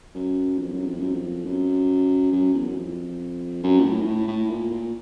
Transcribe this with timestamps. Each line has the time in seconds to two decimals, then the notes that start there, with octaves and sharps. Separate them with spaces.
0.15 F#2
0.59 F2
0.72 F#2
0.86 F2
1.00 F#2
1.12 F2
1.45 F#2
2.32 F#2
2.54 E2
2.68 F#2
2.76 F2
3.63 F#2
3.80 A#2
3.85 A2
4.01 G#2
4.06 A2
4.28 A2
4.50 A#2
4.71 A#2